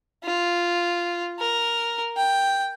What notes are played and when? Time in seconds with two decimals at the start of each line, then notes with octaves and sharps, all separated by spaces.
0.24 F4
1.39 A#4
2.17 G5